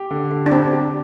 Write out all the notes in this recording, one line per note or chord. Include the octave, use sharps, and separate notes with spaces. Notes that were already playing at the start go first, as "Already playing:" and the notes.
Already playing: G4
D3
D3
D4
C4 G4
G4